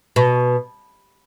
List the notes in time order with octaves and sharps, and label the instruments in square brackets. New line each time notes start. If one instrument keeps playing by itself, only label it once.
[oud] B2